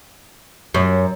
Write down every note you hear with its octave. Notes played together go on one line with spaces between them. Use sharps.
F#2